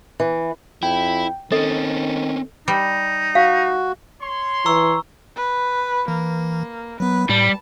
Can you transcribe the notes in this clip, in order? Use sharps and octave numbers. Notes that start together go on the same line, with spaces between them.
E3
F2 E4 G5
D#3 C4 C#4 A4 D#5 A6
G3 D#4
F#4 F5
C#5 C6
E3 A#5 C#6 E6
B4
E3 A#3
F#3 B3 B4
A2 G3 A5